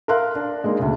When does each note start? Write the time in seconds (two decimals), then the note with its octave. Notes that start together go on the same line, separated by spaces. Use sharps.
0.08 A#4 E5 F5 C6 F#6
0.35 D4
0.64 G#3 A#3 D#4
0.79 D2 C#3